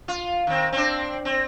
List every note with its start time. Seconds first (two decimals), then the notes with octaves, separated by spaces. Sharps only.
0.08 F4
0.47 D#3 C4
0.72 C4 D4
1.25 C4